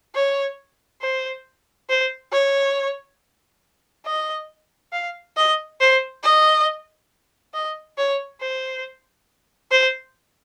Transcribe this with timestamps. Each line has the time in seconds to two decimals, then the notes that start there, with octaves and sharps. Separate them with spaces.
0.15 C#5
1.01 C5
1.89 C5
2.33 C#5
4.06 D#5
4.93 F5
5.37 D#5
5.80 C5
6.24 D#5
7.54 D#5
7.98 C#5
8.41 C5
9.71 C5